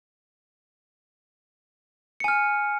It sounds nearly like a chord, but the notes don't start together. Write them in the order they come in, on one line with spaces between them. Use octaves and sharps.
C#7 G#5 F6